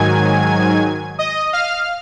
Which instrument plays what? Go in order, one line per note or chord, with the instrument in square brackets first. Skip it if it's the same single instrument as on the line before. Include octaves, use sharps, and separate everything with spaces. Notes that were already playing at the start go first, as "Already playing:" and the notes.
Already playing: [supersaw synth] G#2 D#3 F#3 G#5 G#6
D#5 D#6
F5 F6